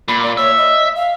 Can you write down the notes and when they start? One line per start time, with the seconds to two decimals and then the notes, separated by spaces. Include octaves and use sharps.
0.08 A#2 B5
0.22 D5
0.37 C#5 E5
0.57 D#5
0.95 F5